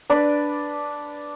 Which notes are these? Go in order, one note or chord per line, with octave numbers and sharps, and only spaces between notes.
D4 B4 D5